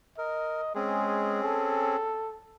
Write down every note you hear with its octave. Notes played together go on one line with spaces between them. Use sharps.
A#4 D#5
G#3 C4 C#4 G#4
A4